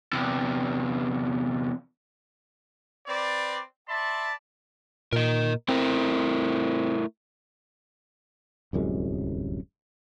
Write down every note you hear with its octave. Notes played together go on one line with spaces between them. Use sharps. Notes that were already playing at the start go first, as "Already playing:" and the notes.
E2 C3
C4 B4 D5
D5 E5 A5 B5 C6
A#2 A#4 D#5
A3 C4 E4 A#4
D1 C2 F#2 G#3